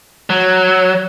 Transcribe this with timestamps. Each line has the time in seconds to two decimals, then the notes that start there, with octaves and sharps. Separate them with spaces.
0.30 F#3